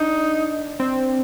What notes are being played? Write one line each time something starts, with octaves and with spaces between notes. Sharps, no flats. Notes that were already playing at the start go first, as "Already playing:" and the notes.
Already playing: D4 D#4
C4